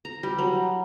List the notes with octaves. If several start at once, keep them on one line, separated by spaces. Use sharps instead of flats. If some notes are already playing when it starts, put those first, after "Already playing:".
A#5
G3
F#3